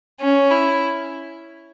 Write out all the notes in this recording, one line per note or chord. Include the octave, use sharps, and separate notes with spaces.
C#4
E4